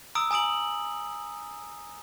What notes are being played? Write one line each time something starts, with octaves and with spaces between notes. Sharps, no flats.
A#5 D#6 E6 D7
G#5 A#5 D#6 D7 F#7